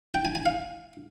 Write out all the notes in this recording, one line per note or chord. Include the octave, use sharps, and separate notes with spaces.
G5
G#5
G#5
F5